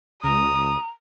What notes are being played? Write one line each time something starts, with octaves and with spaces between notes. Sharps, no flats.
C#2 A#5 D#6